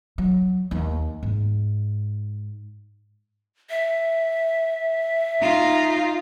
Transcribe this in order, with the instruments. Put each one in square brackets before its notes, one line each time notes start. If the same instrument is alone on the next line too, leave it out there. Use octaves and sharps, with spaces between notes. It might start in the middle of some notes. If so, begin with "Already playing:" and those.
[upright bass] F#3
D#2
G#2
[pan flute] E5
[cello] D#4 F4